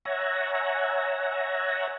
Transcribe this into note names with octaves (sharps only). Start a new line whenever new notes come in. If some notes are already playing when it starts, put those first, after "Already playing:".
C#5 E5 F#5 G#5 A#5